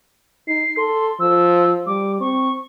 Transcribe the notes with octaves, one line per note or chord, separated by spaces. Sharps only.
D#4 C7
A4 C6
F3 E6
G3 D6
C4 C#6